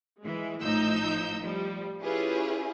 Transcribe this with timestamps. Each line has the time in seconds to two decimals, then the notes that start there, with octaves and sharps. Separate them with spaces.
0.22 E3 G#3
0.61 A1 A2 F3 D#4 E6 G6
1.41 F3 G3
2.02 C#4 E4 F4 G4 G#4 B4